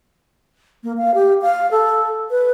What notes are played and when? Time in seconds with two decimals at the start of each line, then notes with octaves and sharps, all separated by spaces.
0.84 A#3
0.98 F5
1.15 G4
1.42 F5
1.71 A4
2.31 B4